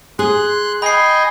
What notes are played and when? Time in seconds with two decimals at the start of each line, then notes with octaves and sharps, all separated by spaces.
0.19 G#4 C6 F#6
0.82 D#5 G5 G#5 B5 C7